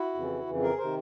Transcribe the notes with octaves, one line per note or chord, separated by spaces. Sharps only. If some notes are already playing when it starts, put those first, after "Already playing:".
Already playing: E4 F#4
F2 C#3 E3
F2 C#3 E3
G#4 A#4
C3 D#3 A#4 C5